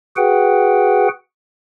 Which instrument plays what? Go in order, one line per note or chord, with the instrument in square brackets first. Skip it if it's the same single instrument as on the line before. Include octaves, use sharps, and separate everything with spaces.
[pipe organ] F#4 G#4 B4 F#5 G5